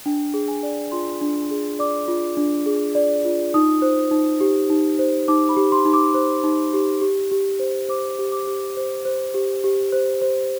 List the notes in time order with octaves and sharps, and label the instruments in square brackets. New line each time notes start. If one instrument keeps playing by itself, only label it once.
[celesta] D4 G5
G#4
G#5
D5
F4 C6
D4
G#4
D5 D6
F4
D4
G#4
D5
F4
D#4 D#6
C5
D#4
G4
D#4
C5
D#4 D6
B5
G4
C6
D#4
D6
C5
D#4
G4
G4
G4
C5
C5 D6
G4
D6
G4
C5
C5
G4
G4
C5
C5